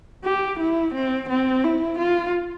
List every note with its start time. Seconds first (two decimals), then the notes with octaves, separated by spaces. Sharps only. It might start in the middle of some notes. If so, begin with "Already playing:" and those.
0.24 G4
0.59 E4
0.94 C4
1.29 C4
1.64 E4
1.99 F4